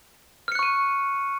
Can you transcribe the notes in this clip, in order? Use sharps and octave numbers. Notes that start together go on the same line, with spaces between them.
C#6 F6 F#6 C#7 D#7